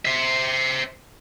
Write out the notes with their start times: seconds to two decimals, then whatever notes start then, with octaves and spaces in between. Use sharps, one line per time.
0.05 C5 E5